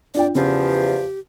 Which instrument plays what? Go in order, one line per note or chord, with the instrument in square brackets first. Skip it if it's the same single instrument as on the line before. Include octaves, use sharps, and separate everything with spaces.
[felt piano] D4 F4 G5 [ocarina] D5
[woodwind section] E2 F3 [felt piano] C#3 [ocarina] G4